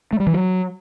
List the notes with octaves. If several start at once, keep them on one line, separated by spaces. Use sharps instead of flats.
A3
G3
E3
F#3